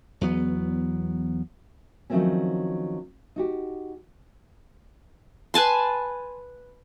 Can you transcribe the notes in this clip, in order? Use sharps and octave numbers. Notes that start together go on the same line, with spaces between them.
E2 F#3 B3
D#3 F3 F#3 A3 C4 C#4
D#4 F#4 G4
B4 G#5 A5 C6